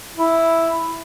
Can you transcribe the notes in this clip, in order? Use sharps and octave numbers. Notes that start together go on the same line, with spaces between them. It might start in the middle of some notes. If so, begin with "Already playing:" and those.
E4